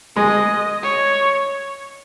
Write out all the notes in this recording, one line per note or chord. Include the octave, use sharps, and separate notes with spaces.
G#3 D#5
C#5